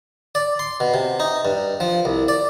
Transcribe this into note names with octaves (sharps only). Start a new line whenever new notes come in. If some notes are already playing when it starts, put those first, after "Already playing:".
D5
C6
B2
C3
D#4
G2
F3
C2
D5